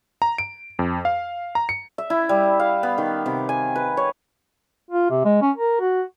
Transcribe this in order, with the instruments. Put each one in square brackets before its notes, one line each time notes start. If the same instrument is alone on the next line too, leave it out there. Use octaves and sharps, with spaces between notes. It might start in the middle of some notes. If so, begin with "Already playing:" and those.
[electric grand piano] A#5
D7
F2
F5
A#5
C#7
[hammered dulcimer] E5
E4
G3
F5
B3
D#3
C3
G#5
B4
C#5
[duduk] F4
C3
G#3
C#4
A#4
F#4